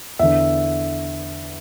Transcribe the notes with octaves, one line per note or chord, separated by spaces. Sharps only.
E2 D3 E5